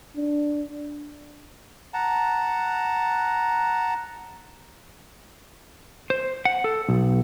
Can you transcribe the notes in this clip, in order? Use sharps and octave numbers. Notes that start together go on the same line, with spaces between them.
D4
F#5 A5 A#5
C5
F#5
A4
B1